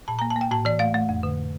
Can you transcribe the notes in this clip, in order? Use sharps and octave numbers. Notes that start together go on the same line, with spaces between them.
A#2 A5
A#3 A#5
A5
A#3
G5
A2 A5
E3 D5
A3 F5
A3
F2
D3